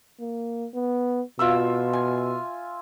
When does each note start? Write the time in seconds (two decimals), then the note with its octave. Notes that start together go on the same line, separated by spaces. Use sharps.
0.20 A#3
0.74 B3
1.39 B2 F4 E5 E6
1.93 G#5